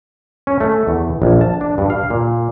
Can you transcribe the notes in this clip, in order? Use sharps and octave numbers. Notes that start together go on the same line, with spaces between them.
C#4
A3
E2
A#1
A5
D4
G2
F5
A#2